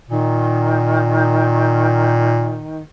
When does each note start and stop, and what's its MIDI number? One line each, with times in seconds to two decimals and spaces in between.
0.10 2.67 46
0.10 2.81 51